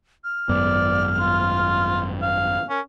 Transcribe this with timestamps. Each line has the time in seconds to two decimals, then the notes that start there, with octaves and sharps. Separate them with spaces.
0.24 F6
0.49 G#1 F#2 B3 D5
1.20 F4
2.22 F5
2.69 C#4 A#4